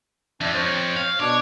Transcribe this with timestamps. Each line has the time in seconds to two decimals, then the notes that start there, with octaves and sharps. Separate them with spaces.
0.41 F2 D4 E5
0.55 C5 C#5
0.97 F5
1.20 B2 D4 C#5 D6